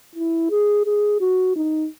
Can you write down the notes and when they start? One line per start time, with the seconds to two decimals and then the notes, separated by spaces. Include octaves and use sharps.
0.15 E4
0.51 G#4
0.86 G#4
1.20 F#4
1.56 D#4